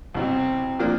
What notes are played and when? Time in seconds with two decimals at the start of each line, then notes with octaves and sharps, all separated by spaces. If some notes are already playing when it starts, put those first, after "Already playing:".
0.14 C2 B2 F#3 C4
0.79 A#2 F3 A#3 D4